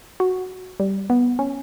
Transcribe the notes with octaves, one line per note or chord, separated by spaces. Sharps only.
F#4
G3
B3
C#4